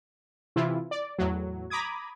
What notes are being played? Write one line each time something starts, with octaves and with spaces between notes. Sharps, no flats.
C3 E3 E4 F4
D5
E2 A2 F#3
A#5 B5 D6 D#6 G#6